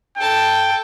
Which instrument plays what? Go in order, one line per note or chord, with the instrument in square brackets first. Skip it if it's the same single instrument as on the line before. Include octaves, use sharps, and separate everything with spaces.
[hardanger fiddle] A4 A5 [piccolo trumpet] G5